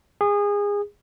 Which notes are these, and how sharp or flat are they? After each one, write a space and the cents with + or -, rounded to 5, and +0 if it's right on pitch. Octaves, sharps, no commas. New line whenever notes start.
G#4 -25